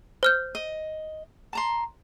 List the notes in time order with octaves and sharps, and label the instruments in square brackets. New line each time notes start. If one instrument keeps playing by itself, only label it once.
[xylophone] C5 F6 G6
[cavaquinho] D#5
A5 A#5 C6